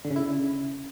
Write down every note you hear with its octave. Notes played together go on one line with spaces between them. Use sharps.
D3
C#3
E4
C#3